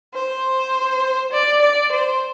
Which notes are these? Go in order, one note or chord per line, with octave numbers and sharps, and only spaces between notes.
C5
D5
D5
C5